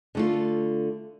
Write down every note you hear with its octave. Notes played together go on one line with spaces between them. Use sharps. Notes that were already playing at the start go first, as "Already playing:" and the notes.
D3 A3 F4